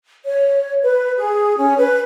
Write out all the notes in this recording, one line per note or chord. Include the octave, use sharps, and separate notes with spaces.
C#5
B4
G#4
C#4
B4